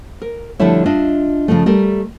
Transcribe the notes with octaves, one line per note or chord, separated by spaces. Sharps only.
A#4
D3 F3 G3 A3 E4 C#5
D4 F4 D#5 E5
C#3 F3 G#3 A3
G3 A3 A#4